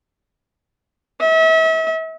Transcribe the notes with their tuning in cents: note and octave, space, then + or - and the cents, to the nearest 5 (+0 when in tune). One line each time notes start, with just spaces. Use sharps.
E5 -40